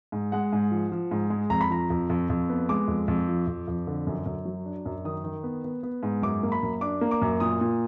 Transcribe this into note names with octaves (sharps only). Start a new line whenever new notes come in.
G#2
G#3 F#5
G#2
F3
F3
G#2
G#3
F2 A#5
B5
F3 A#5
F2
F2
F2
B3
G#3 D6
F2
F2
F3
F2
F2
D3
F#2
F#2
F#3
D4
F#2
D#3 D#6
D#3
B3
B3
B3
G#2
F#2 D6
A#3
B5
F#2
D4 D6
A#3
D6
F#2
A#2 D#6
A#2